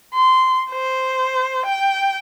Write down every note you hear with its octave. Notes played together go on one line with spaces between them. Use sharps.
C6
C5
G5